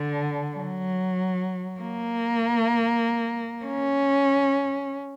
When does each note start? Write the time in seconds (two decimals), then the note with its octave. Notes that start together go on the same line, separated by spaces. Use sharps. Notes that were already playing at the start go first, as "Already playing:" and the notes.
Already playing: D3
0.56 F#3
1.80 A#3
3.66 C#4